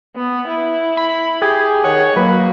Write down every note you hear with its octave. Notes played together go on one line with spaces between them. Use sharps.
B3
E4
B5
G4 G#4
D#3 C#5 F#5
F#3 A#3 B4